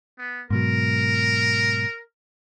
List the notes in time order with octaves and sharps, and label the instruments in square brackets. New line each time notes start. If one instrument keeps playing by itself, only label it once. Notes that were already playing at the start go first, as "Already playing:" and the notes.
[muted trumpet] B3
[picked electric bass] G#2 B2 F#3 [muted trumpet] A#4